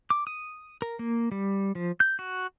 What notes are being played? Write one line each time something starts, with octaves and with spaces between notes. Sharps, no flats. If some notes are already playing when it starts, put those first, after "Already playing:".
D6
D#6
A#4
A#3
G3
F3
G6
F#4